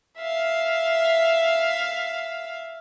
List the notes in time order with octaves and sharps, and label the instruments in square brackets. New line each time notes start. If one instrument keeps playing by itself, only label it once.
[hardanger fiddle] E5 F5